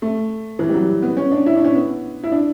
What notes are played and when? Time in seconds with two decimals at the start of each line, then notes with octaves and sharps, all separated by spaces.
0.02 A3
0.59 E3
0.69 G3
0.74 F#3
1.02 B3
1.17 C#4
1.32 D4
1.46 E4
1.56 D4
1.64 C#4
1.75 B3
2.23 E4
2.32 D4